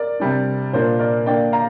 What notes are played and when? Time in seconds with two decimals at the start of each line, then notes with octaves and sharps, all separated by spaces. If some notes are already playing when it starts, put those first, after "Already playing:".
Already playing: A#4 D5
0.20 C3 G3 D4
0.73 A#2 A#3 D4 C5
0.99 A#4 D5
1.26 D3 A#3 D4 D5 G5
1.52 F5 A#5